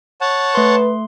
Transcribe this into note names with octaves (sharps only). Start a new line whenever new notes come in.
C#5 F#5 A5
A3 B4 C6